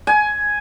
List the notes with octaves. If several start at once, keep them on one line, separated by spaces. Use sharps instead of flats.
G#5